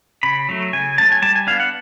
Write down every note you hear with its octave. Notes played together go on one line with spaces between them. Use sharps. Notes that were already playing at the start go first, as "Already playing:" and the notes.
C#3 B5
F#3 A3
C#3 G#5
F#3 A3 A5
G#5
G3 A5
G#5
B3 D4 F5
F#5